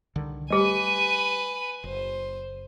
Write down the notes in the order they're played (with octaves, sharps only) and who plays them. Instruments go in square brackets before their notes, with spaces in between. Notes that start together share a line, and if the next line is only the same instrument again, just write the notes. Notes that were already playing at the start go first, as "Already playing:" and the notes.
[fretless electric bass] C2 D3 D#3
[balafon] G3 G4 [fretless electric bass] A3 [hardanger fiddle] B4 G#5
[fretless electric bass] F#1 [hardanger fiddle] C5